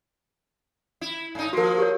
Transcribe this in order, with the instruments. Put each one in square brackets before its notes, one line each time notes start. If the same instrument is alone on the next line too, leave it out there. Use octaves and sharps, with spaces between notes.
[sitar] E4
G#2 D#4
[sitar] F3 A#3 [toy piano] F#4 A#4
[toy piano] G4 A#4 C#5